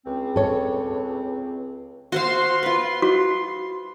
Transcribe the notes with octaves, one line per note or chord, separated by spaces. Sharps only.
C#2 C4
A4 C#5
F#4 C5 F5 C6
F4 B4
F#4